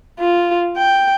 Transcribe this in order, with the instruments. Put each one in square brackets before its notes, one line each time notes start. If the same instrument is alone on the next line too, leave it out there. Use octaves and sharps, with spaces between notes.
[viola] F4
G5